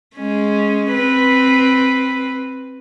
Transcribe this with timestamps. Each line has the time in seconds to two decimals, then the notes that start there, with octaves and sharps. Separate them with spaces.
0.16 G#3 C#4
0.93 C4 B4